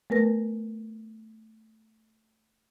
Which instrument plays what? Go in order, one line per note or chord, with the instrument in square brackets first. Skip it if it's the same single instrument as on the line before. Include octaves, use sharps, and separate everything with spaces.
[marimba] A3 B3 A#4 B4 A#6